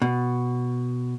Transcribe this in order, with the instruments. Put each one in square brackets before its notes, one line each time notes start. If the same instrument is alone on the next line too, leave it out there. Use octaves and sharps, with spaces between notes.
[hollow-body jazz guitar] B2